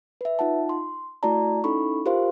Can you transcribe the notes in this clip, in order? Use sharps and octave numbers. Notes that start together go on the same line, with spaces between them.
B4 E5
D#4 F4 F#5 A5
C6
A3 E4 F#4 D5 A5 A#5
C#4 D#4 E4 A4 B5 C#6
F4 G4 A#4 C5 F5 C6